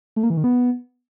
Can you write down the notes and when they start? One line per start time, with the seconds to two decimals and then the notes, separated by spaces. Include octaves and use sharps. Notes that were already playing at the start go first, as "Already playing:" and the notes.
0.16 A3
0.23 A#3
0.30 E3
0.37 D#3
0.44 B3